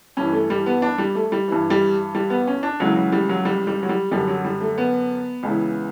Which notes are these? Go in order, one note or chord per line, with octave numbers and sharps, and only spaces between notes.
G2 E3 C#4
A3
G3
B3
D4
G3
A3
G3
G2 E3
G3
G3
B3
C#4
D4
C#2 C#3 E3 F#3
F#3
G3
F#3
G3
G3
F#3
G3
F#2 D3 G3
F#3
G3
A3
B3
C#2 C#3 E3